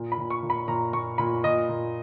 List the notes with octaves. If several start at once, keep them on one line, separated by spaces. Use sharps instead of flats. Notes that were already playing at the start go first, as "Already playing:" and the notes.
Already playing: A#2
B5
A#2
C#6
A#2
B5
A#2 A#5
A#2 C#6
A#2 B5
A#2 D#5
A#2